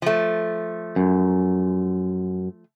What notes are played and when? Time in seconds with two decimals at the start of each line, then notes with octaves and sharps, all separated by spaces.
0.02 F3 A3
0.96 F#2